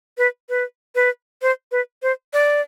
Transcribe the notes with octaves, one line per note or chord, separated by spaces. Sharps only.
B4
B4
B4
C5
B4
C5
D5